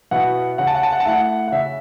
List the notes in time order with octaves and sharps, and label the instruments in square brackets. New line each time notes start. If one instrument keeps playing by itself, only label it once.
[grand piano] B2 B3 E4 F#5
C#3 F#5
A5
F#5
A5
F#5
A5
A3 E4 F#5
F#5
C#3 E5